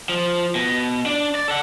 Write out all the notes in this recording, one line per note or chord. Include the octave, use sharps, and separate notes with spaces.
F3
B2
D4
D5
A4 F#5